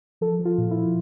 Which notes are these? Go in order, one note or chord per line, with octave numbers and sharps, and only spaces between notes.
F3 A4
F3
F4
A#2
E4
F3